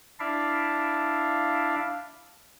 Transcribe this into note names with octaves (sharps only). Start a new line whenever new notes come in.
D4 E4 D5 E5 F5